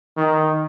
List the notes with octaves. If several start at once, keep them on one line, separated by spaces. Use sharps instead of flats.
D#3